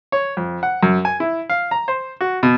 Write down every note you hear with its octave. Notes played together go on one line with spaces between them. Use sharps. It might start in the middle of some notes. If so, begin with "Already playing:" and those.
C#5
F2
F#5
F#2
G#5
E4
F5
A#5
C5
F#4
B2